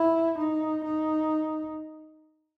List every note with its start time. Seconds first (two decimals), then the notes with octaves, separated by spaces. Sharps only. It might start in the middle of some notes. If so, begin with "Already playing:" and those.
Already playing: E4
0.39 D#4
0.85 D#4